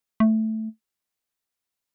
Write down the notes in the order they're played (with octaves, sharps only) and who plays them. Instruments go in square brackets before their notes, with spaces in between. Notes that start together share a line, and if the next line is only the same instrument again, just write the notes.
[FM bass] A3